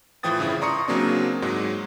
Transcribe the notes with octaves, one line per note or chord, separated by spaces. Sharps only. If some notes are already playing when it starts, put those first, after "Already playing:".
A2 E3 F3 G5 D#6 A6
G1 C#3 E4 D#6
D5 A#5 C6 C#6 D#6 C#7
C#3 F#3 A#3 C4 D4
G#2 F#3 G#3